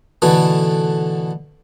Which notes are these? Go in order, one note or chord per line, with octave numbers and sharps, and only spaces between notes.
B2 D3 E3 A3